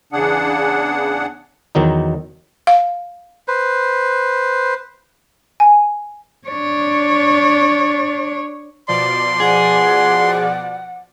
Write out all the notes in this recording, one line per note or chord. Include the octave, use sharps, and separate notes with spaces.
E2 C#3 D4 G#4 F#5
E2 D#3 F#3 D#4
F5
B4 C5
G#5
D4 C#5
B2 F3 D5 C6
G#4 F#5